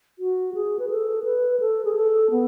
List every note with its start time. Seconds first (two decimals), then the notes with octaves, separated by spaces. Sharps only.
0.19 F#4
0.54 G#4
0.79 B4
0.90 A4
1.24 B4
1.60 A4
1.85 G#4
1.95 A4
2.31 B3